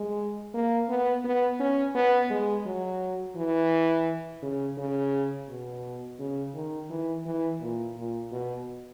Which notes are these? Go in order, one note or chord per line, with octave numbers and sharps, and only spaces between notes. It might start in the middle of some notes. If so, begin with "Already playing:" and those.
Already playing: G#3
A#3
B3
B3
C#4
B3
G#3
F#3
E3
C#3
C#3
B2
C#3
D#3
E3
E3
A#2
A#2
B2